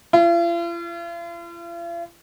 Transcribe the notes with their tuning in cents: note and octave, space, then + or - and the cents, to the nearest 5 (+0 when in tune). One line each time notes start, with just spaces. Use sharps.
F4 -45